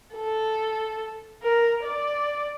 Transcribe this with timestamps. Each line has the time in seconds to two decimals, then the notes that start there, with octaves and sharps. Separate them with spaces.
0.14 A4
1.42 A#4
1.84 D5